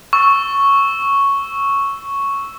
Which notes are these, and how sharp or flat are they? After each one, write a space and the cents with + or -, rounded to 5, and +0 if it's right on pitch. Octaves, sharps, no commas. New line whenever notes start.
C#6 +0 E6 +0